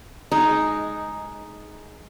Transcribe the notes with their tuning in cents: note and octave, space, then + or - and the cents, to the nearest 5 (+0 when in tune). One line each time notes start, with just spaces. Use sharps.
G#3 +15 D#4 +0